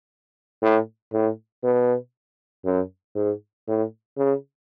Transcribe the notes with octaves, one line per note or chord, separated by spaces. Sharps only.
A2
A2
B2
F#2
G#2
A2
C#3